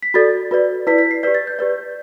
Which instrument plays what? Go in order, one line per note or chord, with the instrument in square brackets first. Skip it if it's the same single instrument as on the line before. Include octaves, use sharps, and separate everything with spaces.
[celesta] B6
F#4 A4 D5 A6
F#4 B4 D5
E4 B4 D5 B6
B6
C7
G4 B4 D5 B6
A6
G6
G4 B4 D5